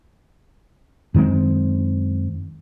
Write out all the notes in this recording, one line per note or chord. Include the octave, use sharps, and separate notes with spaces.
F#2 D#3 G#3 C4